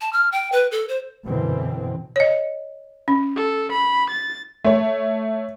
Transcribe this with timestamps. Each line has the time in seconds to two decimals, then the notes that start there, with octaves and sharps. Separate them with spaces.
0.01 A5
0.13 F6
0.32 G5
0.52 B4
0.71 A4
0.89 C5
1.25 F#2 B2 D3 E3 C4
2.16 C#5 D#5
3.08 C#4
3.36 A4
3.72 B5
4.10 A6
4.64 A3 C#5